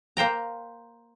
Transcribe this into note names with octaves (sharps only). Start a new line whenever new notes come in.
A#3 C5 G5 A#5